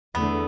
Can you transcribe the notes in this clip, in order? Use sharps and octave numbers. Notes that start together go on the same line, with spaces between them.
E2 D3 A3 B3